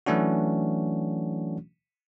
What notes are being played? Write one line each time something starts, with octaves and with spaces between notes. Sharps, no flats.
E3 F#3 A3 C#4 D4 F#4